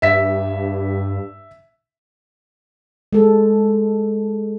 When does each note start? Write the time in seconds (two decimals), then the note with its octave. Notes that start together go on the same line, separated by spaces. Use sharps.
0.02 G2 E5 B6
3.13 G#3 A4